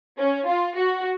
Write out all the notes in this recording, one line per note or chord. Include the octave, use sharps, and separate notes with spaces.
C#4
F4
F#4